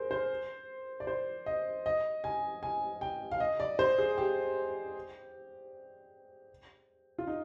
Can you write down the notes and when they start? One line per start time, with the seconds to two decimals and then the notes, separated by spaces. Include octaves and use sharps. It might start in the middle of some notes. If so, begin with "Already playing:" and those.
Already playing: G#4 A#4 C5
0.11 C5
1.00 D5
1.07 C5
1.46 D#5
1.86 D#5
2.24 G#5
2.63 G#5
3.01 G5
3.31 F5
3.40 D#5
3.60 D5
3.79 C5
3.98 G#4
4.18 G4
7.18 F4
7.27 D#4